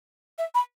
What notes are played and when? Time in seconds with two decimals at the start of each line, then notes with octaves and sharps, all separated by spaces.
0.38 E5
0.55 B5